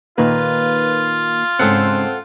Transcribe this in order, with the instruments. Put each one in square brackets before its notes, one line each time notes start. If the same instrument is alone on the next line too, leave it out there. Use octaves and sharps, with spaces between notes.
[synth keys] A#2 D#3 A#3 [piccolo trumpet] F4 [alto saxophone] B4
[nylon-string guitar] G#2 C#3 [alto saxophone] C4 [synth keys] A4 F#5